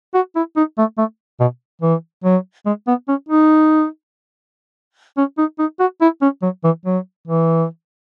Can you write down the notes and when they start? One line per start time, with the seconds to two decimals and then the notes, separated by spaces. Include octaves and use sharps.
0.14 F#4
0.36 E4
0.56 D#4
0.78 A3
0.98 A3
1.40 B2
1.82 E3
2.24 F#3
2.66 G#3
2.88 B3
3.08 C#4
3.29 D#4
5.17 C#4
5.38 D#4
5.59 D#4
5.80 F#4
6.01 E4
6.22 C#4
6.42 F#3
6.64 E3
6.85 F#3
7.27 E3